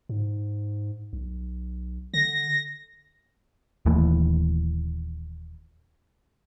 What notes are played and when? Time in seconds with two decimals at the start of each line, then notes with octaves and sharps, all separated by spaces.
0.09 G#2
1.13 B1
2.13 D3 A#6
3.86 D#1 D#2 E3 A3